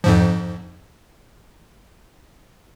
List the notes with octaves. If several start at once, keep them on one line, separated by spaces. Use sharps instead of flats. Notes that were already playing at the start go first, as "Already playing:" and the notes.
F2 G#2 F3